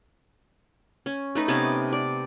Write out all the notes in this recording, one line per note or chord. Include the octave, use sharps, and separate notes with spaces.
C#4
A3 D#4 B4
C3 B3 C#4 A5
D5